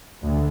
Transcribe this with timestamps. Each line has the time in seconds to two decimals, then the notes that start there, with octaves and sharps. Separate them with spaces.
0.23 D2